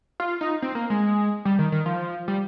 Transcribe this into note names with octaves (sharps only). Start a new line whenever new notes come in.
F4
D#4
C4
A#3
G#3
G3
D#3
D#3
F3
G3